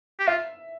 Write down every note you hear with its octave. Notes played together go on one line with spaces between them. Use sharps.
G4
F4 E5